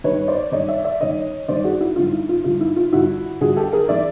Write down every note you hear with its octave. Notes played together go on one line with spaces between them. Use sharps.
G2 D#3 B4 C#5
C5 D5
G2 D#3 C#5 D#5
D5 E5
D5 E5
G2 D#3 C#5 D#5
G2 D#3 C5 D5
F#4 G#4
E4 F#4
G2 D3 F3 F4
E4
F4
G2 D3 F3 F4
E4
F4
G2 D3 F3 E4 F#4
G2 D3 F3 F#4 G#4
G4 A4
G#4 A#4
E3 D5 E5